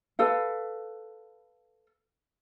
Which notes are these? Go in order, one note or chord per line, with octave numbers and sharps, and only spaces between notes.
A4 B4 F5